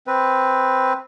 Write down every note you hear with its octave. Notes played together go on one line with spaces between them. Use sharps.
C4 B4